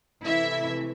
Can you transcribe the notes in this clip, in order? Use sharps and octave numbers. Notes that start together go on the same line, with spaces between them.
C3 E3 A3 E4 E5